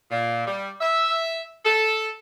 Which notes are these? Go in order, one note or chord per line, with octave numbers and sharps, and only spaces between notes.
A#2
G3
E5
A4